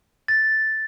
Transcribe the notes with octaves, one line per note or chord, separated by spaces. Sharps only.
A6